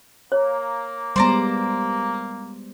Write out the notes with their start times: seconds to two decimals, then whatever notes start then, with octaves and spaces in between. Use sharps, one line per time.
0.32 A#3 C#5
1.16 G3 G#3 B3 C5 D5 A#5 C6